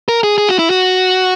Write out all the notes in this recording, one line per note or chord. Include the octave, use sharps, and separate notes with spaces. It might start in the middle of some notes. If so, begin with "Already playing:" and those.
A#4
G#4
G#4
F#4
E4
F#4